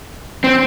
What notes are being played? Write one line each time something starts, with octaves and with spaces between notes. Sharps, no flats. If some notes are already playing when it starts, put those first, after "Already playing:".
C4